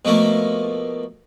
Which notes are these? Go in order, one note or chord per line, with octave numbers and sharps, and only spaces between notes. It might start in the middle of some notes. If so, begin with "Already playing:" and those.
B2 F3 A3 A#3